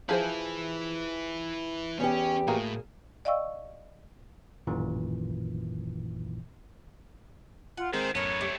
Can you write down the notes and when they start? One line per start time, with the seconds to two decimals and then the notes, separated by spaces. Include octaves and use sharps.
0.09 F3 E4 G#4 B4 C5
2.00 E2 C#4 G4
2.48 A2 A#3 F#4 G#4
3.25 D5 D#5 F5 G5 C#6 E6
4.67 A1 F#2 A#2 D#3 E3
7.77 F4 F#5
7.93 D#3 G#3 C4 G#4 A#4 C5
8.15 F#2 A2 B3 A4 A#4 C#5
8.41 G3 A3 C4